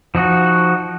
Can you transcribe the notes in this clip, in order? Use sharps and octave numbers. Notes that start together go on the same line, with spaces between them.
F3 D#4 F#4